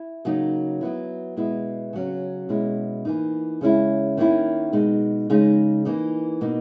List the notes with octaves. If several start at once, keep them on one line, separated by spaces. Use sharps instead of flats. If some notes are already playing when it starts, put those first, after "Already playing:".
Already playing: E4
C#3 F#3 A#3 D#4
F#3 B3 E4
B2 G#3 B3 E4
C#3 F#3 C#4
B2 G#3 C#4 E4
E3 A#3 D#4
C#3 G#3 C#4 E4
D#3 A#3 C#4 E4
B2 G#3 D#4
C#3 G#3 D#4
E3 A#3 D#4
B2 A#3 D#4